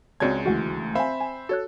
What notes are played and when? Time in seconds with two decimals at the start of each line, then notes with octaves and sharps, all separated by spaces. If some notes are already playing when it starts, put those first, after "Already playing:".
0.20 C#2 G#3 C4 F#4 C#5 D5 A5 G#6
0.46 D2 E3 F#4 F#5
0.95 C4 C5 E5 F5 G#5 B5
1.21 G#5
1.49 F#4 A4 C#5 F#6